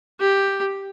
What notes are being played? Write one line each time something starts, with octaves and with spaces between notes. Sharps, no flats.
G4